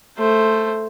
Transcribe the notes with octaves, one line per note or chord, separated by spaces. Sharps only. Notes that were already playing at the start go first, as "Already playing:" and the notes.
A3 C5